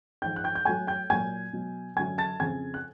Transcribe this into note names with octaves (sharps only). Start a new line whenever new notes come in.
G#2 F3 G5 G6
F#6
G5 G6
G6
A2 F#3 G#5 G#6
G5 G6
A#2 F#3 G#5 G#6
B2 F#3
F#2 D3 F#3 G#5 G#6
A5 A6
F2 C#3 F3 G#5 G#6
F#6